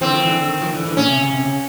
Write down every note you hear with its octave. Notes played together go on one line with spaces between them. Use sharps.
D3 E3 C4
D#3 F3
D3 E3
D3
D#3
D#3 F3
D3 E3
D3 E3
A#2 C#4
C3
C#3
C3
C#3